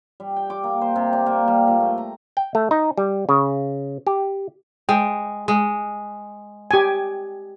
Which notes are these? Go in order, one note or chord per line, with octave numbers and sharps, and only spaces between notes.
G3
G5
D6
A#3
C5
C3
D5
A#3
G3
A#2
A3
A#5
G5
A3
D#4
G3
C#3
G4
G#3 G5
G#3
G4 G#5